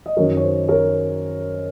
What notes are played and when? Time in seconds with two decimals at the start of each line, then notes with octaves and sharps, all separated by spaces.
0.06 D#5
0.17 F#2 D#3 F#3 A#4 C#5
0.37 C#5
0.43 C5
0.68 A#4 C#5